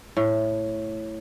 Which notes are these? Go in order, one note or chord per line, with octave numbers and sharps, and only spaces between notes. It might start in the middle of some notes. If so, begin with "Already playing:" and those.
A2